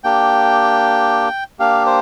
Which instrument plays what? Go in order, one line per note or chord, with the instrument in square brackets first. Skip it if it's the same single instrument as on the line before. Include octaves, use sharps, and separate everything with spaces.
[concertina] A#3 D4 G4 G5
A#3 D4 G4 F5
C5